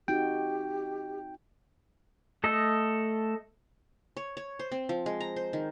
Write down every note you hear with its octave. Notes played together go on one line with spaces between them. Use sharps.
C4 D#4 F#4 G4 G5
A3 A4 D#5
C#5
C#5
C5
C4
F3
G#3
A#5
C5
D#3